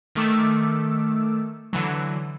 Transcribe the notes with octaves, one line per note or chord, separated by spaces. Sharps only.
D#3 A3 D6 E6
D3 E3 F#3